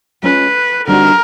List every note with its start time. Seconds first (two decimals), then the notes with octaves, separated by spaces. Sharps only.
0.23 G#3 C#4 F4 B4
0.87 D3 G3 C4 D#4 F#4 A#4